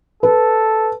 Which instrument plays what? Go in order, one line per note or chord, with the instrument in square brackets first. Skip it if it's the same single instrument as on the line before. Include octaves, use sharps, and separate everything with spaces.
[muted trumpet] A4 [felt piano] B4